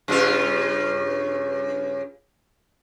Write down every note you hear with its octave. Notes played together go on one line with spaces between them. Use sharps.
G2 C#3 F4